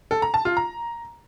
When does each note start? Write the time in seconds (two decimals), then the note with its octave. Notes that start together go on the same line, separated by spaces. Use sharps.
0.11 A4
0.22 A#5
0.34 A5
0.45 F4
0.57 A#5